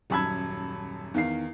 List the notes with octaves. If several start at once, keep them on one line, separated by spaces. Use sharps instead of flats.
D#1 F#2 A5 B5 E6 G#6
E2 D#3 F5 C7